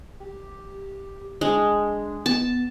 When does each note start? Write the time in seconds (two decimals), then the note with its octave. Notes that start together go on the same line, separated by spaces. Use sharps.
0.20 G4
1.41 G#3 D4
2.26 B3 A5